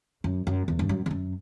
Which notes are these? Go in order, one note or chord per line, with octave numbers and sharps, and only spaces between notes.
F#2
F#2
E2
G2
F#2
E2
F#2